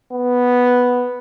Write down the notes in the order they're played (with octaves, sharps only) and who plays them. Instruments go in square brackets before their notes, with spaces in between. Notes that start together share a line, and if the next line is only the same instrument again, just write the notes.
[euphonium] B3